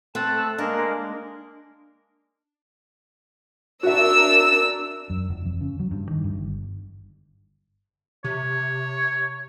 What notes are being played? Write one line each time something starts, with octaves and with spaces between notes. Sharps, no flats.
A3 C4 A5 E6 F#6
G#3 A#3 D4 A#4
D4 F#4 A#4 E5 E6
F#2
F1
F2
C#3
F#3
G2
D#3
G2
G1
C3 C#5